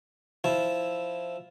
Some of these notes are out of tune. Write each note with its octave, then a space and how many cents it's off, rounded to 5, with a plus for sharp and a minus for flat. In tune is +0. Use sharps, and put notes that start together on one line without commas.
F3 +0 E4 +0